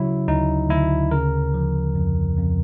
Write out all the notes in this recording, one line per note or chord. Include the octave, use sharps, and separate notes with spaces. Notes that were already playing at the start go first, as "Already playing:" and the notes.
Already playing: C#3 F#3 E4
D2 D#4
D2 E4
C#3 A#4
F3
F2
F2